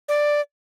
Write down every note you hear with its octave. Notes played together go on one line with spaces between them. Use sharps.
D5